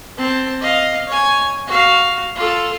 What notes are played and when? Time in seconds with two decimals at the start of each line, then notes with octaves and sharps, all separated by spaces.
0.17 C4 A5
0.61 D#5 F5
1.07 C#5 G#5
1.67 F#4 F5
2.35 F4 A4